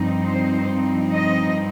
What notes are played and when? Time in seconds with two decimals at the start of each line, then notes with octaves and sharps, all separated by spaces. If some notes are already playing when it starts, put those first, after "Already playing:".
Already playing: G2 F3 C4 D#4
0.29 C5
1.13 D#5